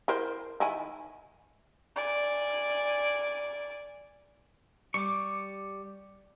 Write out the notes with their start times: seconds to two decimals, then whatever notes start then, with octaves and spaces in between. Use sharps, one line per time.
0.08 E4 A#4 C5
0.60 D#3 E4 G#5
1.96 D5 G#5
4.94 G3 C#6 D6